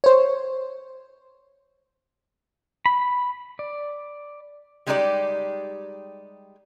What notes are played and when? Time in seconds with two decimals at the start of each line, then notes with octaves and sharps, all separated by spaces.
0.04 C5 C#5
2.86 B5
3.59 D5
4.87 G3 G#3 D#4 G4 A4 D5